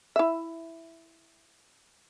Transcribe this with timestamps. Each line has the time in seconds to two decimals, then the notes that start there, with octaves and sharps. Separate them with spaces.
0.16 E4 E5